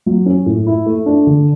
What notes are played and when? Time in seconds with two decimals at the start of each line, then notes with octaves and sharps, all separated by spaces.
0.06 F#3
0.26 C#4
0.46 A2
0.67 E4
0.86 A3
1.06 D4
1.27 D3